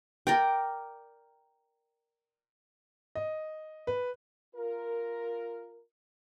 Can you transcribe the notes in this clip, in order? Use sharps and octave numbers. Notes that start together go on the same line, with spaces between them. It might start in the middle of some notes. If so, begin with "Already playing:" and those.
A#4 D5 G5
D#5
B4
F4 A#4